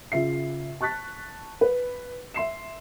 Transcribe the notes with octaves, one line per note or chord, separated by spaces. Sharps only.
C#3 F4 E5 C7
A5 C#6 F#6 A6 B6
B4
E5 C6 C7 E7